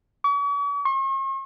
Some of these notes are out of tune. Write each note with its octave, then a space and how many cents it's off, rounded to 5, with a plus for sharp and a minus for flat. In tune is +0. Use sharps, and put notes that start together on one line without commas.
C#6 +45
C#6 -45